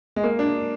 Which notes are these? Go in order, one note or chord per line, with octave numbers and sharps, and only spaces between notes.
G#3
A#3
D4